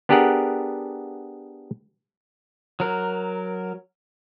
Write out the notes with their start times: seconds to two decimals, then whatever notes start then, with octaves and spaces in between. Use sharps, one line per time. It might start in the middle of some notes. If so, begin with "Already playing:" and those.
0.09 B3 D4 G4 G#4 A#4 F#5
2.80 F#3 A#4